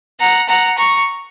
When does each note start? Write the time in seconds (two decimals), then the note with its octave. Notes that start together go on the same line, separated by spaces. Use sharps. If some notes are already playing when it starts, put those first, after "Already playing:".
0.19 F#5 A#5
0.48 F#5 A#5
0.77 A#5 C#6